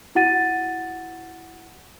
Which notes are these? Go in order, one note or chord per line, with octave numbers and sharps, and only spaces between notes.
E4 F#4 F#5 A6 D#7